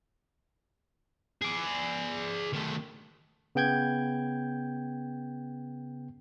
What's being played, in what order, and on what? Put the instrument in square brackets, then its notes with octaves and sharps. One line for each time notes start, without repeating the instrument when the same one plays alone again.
[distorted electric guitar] G#4 D5
D#3 A3
[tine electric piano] C#3 B3 G5 G6 G#6